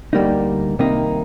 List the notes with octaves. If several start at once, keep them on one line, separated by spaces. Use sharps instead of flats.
D2 D3 G3 A#3 D#4
C2 C3 D#3 A#3 D#4